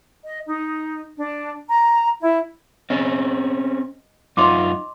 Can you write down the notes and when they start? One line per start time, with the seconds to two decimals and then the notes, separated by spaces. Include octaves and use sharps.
0.24 D#5
0.46 D#4
1.16 D4
1.68 A#5
2.20 E4
2.90 C4 C#4 G#4 D#5
4.37 F#2 D#4 F4 D#5 C6 D6